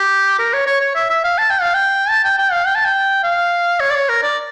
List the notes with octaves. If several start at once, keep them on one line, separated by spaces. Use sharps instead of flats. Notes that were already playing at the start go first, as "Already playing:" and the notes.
Already playing: G4
A#4
C#5
C#5
C#5
E5
E5
F5
A5
G5
F5
G5
A5
G5
G5
F5
G5
A5
G5
F5
C#5
D5
C#5
A#4
D5